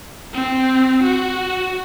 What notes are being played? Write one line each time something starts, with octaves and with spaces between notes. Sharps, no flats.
C4
F#4